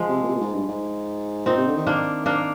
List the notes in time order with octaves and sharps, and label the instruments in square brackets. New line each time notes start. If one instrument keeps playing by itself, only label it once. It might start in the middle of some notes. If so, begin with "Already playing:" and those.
Already playing: [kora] F3 G#3
[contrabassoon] C3
A#2
C3
A#2
G#2
G2
G#2
[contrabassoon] A#2 [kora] C4 D#4
[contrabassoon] C3
D3
D#3
[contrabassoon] D#3 [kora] A#3 D4
[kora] A#3 D4